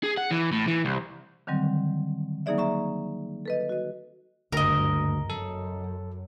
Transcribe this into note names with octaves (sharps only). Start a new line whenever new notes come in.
G#4
F#5
E3
A2
E3
C2
D3 D#3 F#3 G3 C4
F#3 A#3 D#4 G#4 D5 E5
E5 A#5 C#6
A4 B4 D#5
F#4 D#5
F#1 D2 G2 A#4 D#5
F#2 A4